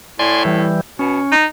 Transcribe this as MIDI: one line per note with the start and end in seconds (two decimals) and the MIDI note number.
0.19 0.71 45
0.19 0.43 74
0.19 0.43 80
0.19 0.43 84
0.45 0.81 52
0.45 0.81 55
0.99 1.21 47
0.99 1.36 61
1.32 1.45 63